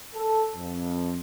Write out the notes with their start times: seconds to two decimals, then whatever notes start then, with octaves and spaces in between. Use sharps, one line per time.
0.15 A4
0.55 F2